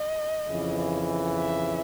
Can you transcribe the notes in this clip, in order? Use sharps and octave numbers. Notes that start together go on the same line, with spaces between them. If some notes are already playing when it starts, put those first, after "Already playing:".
Already playing: D#5
F2 C#3 E3
E5